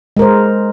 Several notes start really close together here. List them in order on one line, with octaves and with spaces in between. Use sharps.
G#3 A#4 C5